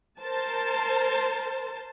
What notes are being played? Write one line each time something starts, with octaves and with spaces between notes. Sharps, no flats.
A#4 C5 A5